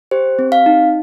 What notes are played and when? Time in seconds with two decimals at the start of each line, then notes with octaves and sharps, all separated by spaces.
0.11 G4 C5
0.39 C4
0.52 F5
0.66 D#4